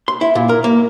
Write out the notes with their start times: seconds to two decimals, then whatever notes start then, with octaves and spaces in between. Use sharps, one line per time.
0.08 C6
0.21 E4
0.35 A#2
0.49 A#4
0.64 A#3